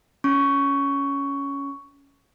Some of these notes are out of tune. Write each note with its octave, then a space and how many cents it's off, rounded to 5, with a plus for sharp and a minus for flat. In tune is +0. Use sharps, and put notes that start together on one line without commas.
C#4 +10 C#6 +10